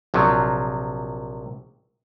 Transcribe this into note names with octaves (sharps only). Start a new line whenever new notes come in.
A#1 C3 F3 F#3